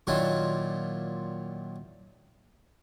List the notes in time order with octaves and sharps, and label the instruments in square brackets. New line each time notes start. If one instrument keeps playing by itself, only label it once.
[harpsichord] A#2 D#3 F#3 D4 E4 F4